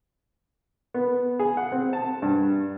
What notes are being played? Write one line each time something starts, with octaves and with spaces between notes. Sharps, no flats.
B3
G#4
F#5
C4
A5
G2